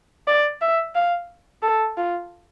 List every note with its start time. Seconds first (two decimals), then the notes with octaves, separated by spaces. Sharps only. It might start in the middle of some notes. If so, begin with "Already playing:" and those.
0.27 D5
0.61 E5
0.95 F5
1.62 A4
1.97 F4